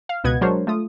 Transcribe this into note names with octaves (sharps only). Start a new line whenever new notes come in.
F5
C#2 B2 B4 D#5 F#5 G#6
F#3 G#3 D4 A#4 C5 C#5
A3 F4 D#6